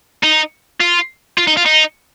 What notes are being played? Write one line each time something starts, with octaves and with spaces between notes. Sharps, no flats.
D#4
F4
F4
D#4
F4
D#4